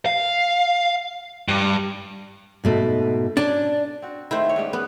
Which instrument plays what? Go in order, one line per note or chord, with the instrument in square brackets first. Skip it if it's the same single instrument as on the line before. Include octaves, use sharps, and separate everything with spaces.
[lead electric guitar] F5
G2
[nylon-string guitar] G#2 B2 A3
[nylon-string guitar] C#4 [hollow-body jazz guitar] D4
[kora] C4 F#4
[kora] D#3 A3 [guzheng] E4 C5
[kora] B3 C#5
G#2 G3 C#4
[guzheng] B3